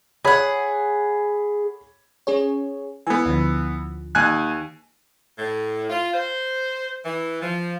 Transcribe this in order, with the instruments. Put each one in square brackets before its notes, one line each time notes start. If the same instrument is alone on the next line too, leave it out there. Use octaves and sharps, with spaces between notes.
[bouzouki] G#4 F#5 [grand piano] C#5 B5 G#6
[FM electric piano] C#4 G#4 C#5
[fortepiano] E3 B3 [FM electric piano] G#5
[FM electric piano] D2 D3 F3
[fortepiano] D#2 G#5 F#6
[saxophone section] A2
F4
C5
E3
F3